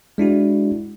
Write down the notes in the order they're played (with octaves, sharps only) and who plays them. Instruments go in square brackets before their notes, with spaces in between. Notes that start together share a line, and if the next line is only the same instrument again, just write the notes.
[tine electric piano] G#3 D4 E4 F#4